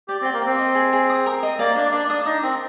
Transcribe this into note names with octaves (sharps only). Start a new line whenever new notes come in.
G4 D5
C4
G5
A#3
C4 G5
D#5
G#4
G#4
D#6
A#4
D#5
A#3 D5
D4 D5
D4 D5
D4 D#6
D#4 D#6
C4 A#4